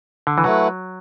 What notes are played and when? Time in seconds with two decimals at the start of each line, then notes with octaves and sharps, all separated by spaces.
0.27 D3
0.38 E3
0.44 F#3 A3 E4 B4 F#5